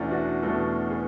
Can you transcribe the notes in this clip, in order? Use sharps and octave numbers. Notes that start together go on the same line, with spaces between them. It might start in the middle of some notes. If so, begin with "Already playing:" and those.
Already playing: E2 B2 A3 C#4 D4 E4
D4 F#4
E2 B2 A3 F#4 A4
G#4 B4